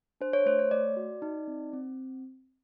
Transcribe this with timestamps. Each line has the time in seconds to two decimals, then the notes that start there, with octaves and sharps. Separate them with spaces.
0.21 D4 C5
0.33 C#5
0.46 A3 C5
0.59 C#5
0.71 A3 D5
0.97 F#4
1.22 D#4
1.48 C4
1.73 C4